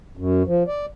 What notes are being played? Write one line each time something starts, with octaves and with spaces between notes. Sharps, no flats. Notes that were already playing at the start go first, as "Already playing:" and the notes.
F#2
F3
D5